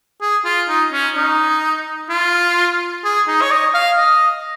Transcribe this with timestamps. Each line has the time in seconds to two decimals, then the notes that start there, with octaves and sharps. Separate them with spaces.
0.22 G#4
0.45 F4
0.69 D#4
0.93 C#4
1.16 D#4
2.10 F4
3.05 G#4
3.28 D#4
3.42 C#5
3.51 D#5
3.75 F5
3.98 D#5